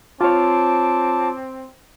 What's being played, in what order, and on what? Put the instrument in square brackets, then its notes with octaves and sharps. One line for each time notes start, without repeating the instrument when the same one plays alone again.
[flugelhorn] C4 [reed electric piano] F4 C#5 [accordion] A5 D6